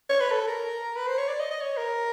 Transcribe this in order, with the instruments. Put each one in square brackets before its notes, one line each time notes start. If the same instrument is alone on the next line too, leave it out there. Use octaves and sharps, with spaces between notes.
[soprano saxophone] C#5
B4
A4
A#4
B4
C5
C#5
D5
D#5
D#5
C#5
A#4